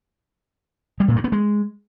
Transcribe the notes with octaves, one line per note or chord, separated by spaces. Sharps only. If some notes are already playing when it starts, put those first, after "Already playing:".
G3
A#2
G2
B3
G#3